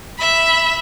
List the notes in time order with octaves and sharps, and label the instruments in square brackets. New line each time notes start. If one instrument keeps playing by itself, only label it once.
[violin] E5 B5